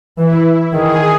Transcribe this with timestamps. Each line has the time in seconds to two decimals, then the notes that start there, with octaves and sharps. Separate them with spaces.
0.18 E3 E4
0.73 D#3 G#4